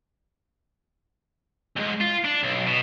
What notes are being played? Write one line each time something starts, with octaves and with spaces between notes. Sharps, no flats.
D#2 G#2
F4
D4
B1
B2